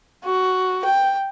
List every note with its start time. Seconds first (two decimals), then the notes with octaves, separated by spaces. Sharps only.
0.24 F#4
0.85 G5